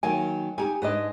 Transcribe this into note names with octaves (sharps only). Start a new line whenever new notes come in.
D#3 F#3 A#3 G#5
D#4 G4 G#5
G#2 G#3 D4 B4 D#5